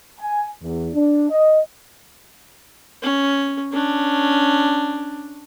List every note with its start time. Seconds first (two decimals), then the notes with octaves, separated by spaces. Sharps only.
0.20 G#5
0.63 E2
0.95 D4
1.31 D#5
3.02 C#4
3.72 C#4 D4